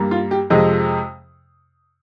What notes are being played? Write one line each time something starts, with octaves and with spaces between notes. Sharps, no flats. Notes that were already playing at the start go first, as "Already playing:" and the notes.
Already playing: G2 G3 A#3
F4
G4
F2 C3 F3 G#3 D#5